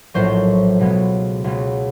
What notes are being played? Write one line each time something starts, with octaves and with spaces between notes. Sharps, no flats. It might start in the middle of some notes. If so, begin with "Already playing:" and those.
A#1 A2 F#3 C5
C#2 B2 G#3 B3
C#2 B2 G#3 B3